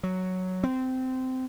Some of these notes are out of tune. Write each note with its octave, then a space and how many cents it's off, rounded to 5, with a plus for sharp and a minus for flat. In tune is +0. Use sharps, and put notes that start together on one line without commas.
F#3 +0
C4 -20